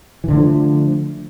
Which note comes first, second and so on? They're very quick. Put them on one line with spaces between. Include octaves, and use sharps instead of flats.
E3 D3 A3 F3